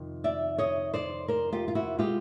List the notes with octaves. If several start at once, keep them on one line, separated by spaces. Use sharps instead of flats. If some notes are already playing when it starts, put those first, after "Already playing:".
Already playing: F2 C3 D#3
D5 E5
C#5 D#5
C5 D5
A#4 C5
F4 G4
F4
E4 F#4
B2 G#3 C4 F4 G4